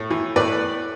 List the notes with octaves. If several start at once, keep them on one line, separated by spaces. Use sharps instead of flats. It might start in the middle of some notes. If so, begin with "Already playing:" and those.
Already playing: A2
E3
A2 B4 D5